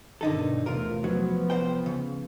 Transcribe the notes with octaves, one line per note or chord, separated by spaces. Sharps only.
G2 B2 D3 D#3 D#4 A4
E2 A2 C3 F4 A#4
F3 F#3 B3
C2 C5 G5
C#3